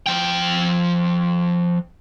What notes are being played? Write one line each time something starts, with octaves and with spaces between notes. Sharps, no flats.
F3 G5